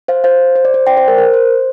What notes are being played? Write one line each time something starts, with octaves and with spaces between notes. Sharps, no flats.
C5 F5
C5 F5
C5
D5
C5
D5 G5
C5
A#4
A#4
C5